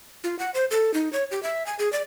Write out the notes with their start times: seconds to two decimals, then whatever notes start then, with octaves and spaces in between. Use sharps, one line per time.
0.24 F4
0.39 F#5
0.54 C5
0.71 A4
0.94 D#4
1.13 C#5
1.31 G4
1.43 E5
1.66 G#5
1.79 G#4
1.93 D5